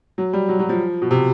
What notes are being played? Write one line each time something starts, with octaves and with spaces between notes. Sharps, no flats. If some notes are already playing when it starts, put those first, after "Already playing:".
F#3
G3
F#3
F#3
F3
B2
C3